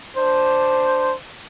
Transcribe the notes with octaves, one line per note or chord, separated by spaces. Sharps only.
D4 C5